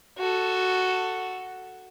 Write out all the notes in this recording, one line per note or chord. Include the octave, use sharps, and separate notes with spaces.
F#4 A4